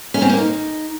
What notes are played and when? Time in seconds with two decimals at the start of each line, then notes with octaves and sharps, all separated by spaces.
0.14 C#4
0.22 C4
0.29 A#3
0.37 D#4